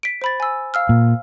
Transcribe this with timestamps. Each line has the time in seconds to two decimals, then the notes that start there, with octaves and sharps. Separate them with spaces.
0.03 B6 D7
0.22 C5 B5 A6
0.40 G#5 E6
0.74 F5 E6 F6
0.89 A#2